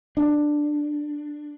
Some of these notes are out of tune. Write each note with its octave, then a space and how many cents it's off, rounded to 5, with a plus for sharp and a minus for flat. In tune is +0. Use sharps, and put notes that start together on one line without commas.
D4 +10